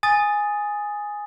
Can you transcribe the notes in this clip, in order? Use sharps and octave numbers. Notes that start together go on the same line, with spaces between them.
G#5 D#6 A6